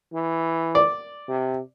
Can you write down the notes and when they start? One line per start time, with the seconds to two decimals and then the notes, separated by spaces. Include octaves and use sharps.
0.13 E3
0.75 D5
1.28 C3